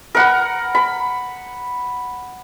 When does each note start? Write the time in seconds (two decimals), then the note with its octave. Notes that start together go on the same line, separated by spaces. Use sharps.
0.15 A#4 F#5 B5
0.75 B5